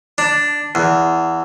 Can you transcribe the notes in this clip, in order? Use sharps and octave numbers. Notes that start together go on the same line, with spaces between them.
D4
E2